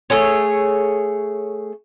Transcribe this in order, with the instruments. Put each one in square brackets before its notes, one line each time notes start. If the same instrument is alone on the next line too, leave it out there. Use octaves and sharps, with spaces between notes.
[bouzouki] A3 G#4 C#5